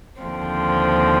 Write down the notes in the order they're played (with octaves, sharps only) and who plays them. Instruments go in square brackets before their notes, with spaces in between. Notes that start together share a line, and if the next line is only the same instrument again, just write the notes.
[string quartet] D#2 D3 F3 C4